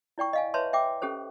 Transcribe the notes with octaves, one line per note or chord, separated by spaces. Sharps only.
E4 D5 G5 C#6
D#5 F5 G#5
B4 C#5 E5 A5 C6
E5 G5 D6
C#4 G4 A4 C5